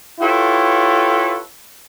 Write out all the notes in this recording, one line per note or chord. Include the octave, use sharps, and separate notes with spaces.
E4 F4 G4 A4 B4 C#5